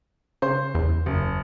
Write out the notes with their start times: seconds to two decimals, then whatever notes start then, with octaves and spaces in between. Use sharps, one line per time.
0.42 C#3 C5 C6
0.75 E2
1.06 F#1